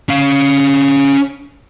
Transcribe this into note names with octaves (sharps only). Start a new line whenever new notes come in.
C#4 F5